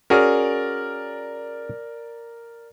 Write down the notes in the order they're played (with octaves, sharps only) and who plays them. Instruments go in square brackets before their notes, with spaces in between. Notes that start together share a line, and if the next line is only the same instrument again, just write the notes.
[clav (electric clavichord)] C#4 F#4 G#4 [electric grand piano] A#4 D5 F6